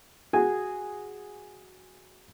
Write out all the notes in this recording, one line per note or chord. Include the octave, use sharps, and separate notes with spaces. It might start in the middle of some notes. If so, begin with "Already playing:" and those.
F#4 G#4 G#5